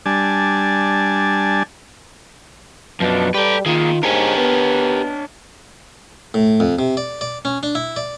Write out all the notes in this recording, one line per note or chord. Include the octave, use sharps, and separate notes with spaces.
G3 D4 G#5 A5
F#2 B2 F3 D4
G3 G4 A4 B4
D#3 A#3 F4 G#4
G#2 D4 G4 A#4 C#5 G#5
B3
A2
F2
C3
D5
D5
C#4
D4
E4
D5